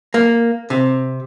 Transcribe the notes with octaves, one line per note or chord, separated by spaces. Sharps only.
A#3
C3